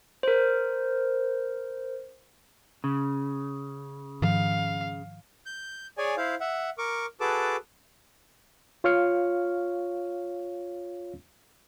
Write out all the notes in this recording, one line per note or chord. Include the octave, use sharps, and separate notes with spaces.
A#4 C5
C#3
G#2 D#3 F3 F5
G6
G#4 C#5 D5 G#5
E4 C5 F5
E5 F#5
A#4 C#6 D6
F#4 G#4 A4 B4 A5 D6
F4 C#5 F5 F6 C#7